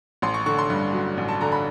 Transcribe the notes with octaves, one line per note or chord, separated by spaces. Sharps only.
A1 C6
C#6
D3 C#6
C6
G2
F#3
A1
A5
D3 A#5
B5